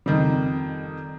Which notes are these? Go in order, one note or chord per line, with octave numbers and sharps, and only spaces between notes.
F2 D#3 G3